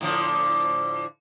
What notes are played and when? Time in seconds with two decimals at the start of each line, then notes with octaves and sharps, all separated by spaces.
0.01 A2 D3 F3